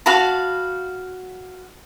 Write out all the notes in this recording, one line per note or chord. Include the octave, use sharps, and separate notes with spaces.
F#4 F5 A5 B5